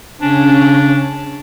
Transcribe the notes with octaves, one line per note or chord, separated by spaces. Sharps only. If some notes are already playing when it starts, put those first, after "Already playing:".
C#3 C#4 D4